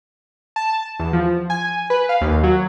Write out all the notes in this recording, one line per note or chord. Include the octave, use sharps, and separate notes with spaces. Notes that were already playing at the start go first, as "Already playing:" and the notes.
A5
E2
F3
G#5
B4
F5
D#2
F#3